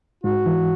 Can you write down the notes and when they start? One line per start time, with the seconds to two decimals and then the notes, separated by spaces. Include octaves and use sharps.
0.24 G#2 F#4
0.46 E3